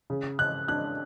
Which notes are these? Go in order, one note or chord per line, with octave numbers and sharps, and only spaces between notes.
C#3
C#3 F#6
D4 F#6